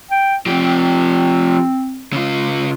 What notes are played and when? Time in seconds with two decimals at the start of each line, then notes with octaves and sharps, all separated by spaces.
0.11 G5
0.46 F3 C4 G4
2.13 C#3 F4